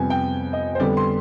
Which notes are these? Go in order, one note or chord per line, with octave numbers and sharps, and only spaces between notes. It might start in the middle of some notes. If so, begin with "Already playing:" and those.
Already playing: F2 C3 G3 B3 G#5
G5
D#5
C5
F2 D3 G3 B3 D5
C6